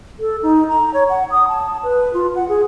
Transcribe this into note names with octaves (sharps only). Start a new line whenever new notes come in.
A4
D#4
A#5
C#5
F#5
D#6
A5
B4
F4
F#5
G#4